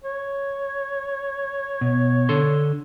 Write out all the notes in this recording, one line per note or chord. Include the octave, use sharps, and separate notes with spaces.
C#5
B2
D3 A4 C6